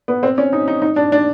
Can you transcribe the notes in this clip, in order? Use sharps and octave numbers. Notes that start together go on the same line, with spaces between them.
B3
C4
C#4
D#4
D#4
D#4
D4
D4